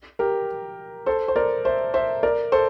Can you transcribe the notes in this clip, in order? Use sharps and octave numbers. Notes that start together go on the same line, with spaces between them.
G4 A#4
A4 C5
C5
A#4 D5
C5 E5
C5 E5
A#4 D5
A4 C5